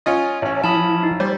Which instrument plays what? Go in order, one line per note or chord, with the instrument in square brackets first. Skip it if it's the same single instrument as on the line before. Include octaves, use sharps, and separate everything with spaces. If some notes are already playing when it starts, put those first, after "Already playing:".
[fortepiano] C#4 F4 D#5
[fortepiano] A1 C#4 [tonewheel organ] C#5 A5
[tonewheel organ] F3 E4 [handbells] A5 B5 D#6
[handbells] D#4
[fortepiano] G3 [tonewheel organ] C5 C#5